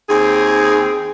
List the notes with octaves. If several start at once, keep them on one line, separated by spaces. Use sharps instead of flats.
D#2 C4 G#4